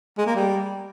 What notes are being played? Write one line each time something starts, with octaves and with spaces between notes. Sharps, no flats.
G#3
A#3
G3